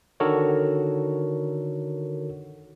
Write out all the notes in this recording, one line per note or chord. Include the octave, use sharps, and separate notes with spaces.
D3 D#3 F#4 A4 A#4 C#5